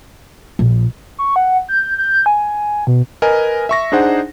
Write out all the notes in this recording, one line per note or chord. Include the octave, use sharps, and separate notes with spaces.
A#1
C#6
F#5
G6
G6
G#5
B2
A#4 B4 D#5 G#5
E5 C#6 A#6
D4 D#4 G#4 C5 F#5